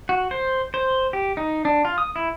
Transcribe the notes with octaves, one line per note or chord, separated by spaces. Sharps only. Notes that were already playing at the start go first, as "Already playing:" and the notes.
F#4
C5
C5
G4
D#4
D4
F4
D#6
E4